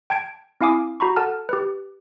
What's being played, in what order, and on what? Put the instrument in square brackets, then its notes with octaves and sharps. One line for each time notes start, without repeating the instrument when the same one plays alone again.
[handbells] G5 A5 G#6 D7
C4 E4 F5 G#5 D6 D#6
F#4 A#5 B5 C#6
A4 F#5 A5 F6
G4 B4